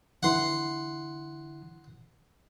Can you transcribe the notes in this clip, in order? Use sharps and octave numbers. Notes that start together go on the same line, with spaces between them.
D3 E3 E4 F#5 C6